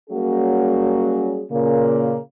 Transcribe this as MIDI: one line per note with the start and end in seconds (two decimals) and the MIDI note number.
0.10 1.44 54
0.10 1.44 55
0.10 1.44 58
0.10 1.44 61
0.10 1.44 66
0.10 1.44 68
1.50 2.15 46
1.50 2.15 49
1.50 2.15 58